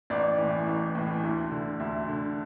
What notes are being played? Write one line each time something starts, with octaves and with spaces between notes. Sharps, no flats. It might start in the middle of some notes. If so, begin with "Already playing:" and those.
A1 D5
A2 E3
A1
A2 E3
D2
D3
D2 E5
D3